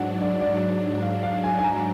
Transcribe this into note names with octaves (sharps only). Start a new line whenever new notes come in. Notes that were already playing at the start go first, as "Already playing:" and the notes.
Already playing: G#2 F#3 D4 F#5
D5
D5
F5
F5
G#5
G#5
A#5